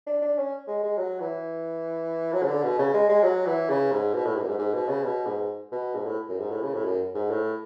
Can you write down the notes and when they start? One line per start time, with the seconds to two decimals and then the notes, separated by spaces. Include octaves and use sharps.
0.07 D4
0.22 D4
0.38 C#4
0.68 G#3
0.83 G#3
0.98 F#3
1.20 E3
2.33 F#3
2.43 C#3
2.48 D3
2.63 B2
2.78 C#3
2.94 G#3
3.09 G#3
3.23 F#3
3.46 E3
3.69 C#3
3.92 G#2
4.14 B2
4.25 A2
4.36 G#2
4.43 F#2
4.48 G#2
4.58 G#2
4.74 B2
4.89 C#3
5.04 B2
5.26 G#2
5.72 B2
5.95 G#2
6.06 A2
6.29 F#2
6.39 G#2
6.51 A2
6.63 C#3
6.74 A2
6.85 F#2
7.14 G#2
7.30 A2